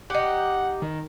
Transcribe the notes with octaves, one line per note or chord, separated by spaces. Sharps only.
D#4 G4 F#5
D#3